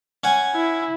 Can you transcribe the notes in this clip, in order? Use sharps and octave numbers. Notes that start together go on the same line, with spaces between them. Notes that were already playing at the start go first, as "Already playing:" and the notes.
C#4 F#5 G#5
E4